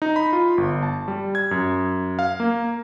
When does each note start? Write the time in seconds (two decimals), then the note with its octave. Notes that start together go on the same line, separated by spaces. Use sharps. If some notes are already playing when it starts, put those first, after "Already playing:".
0.02 D#4
0.16 B5
0.33 F4
0.58 G1
0.83 A5
1.08 G3
1.35 G#6
1.51 F#2
2.19 F5
2.40 A#3